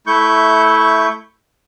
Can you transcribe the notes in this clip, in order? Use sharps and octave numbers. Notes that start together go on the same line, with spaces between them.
A3 E4 C#6 G6